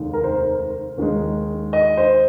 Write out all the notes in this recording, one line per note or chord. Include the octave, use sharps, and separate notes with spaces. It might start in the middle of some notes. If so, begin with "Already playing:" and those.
Already playing: F1 D#2 D#3 G#3
A#4
C5
D#2 D#3 G#3
D#5
C5